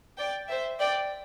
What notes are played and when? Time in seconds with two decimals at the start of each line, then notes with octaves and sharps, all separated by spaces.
0.18 D5 G5
0.49 C5 E5
0.80 D5 G5